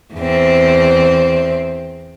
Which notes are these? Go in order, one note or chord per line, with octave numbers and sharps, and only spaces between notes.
E2 C4